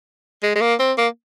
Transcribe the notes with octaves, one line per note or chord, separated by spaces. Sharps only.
G#3
G#3
A#3
C4
A#3